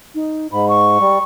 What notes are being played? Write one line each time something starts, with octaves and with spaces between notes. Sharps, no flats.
D#4
G#2 B5
C#6
G3